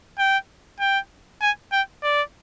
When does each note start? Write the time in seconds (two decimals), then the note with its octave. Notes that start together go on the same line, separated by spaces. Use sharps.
0.19 G5
0.80 G5
1.41 G#5
1.72 G5
2.03 D5